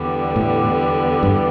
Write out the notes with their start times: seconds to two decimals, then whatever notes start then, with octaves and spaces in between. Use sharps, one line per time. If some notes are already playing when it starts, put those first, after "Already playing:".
Already playing: E2 D3 G3 B3
0.36 A2
1.23 G2